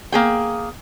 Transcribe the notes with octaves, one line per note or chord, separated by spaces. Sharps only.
A#3 G#4 G5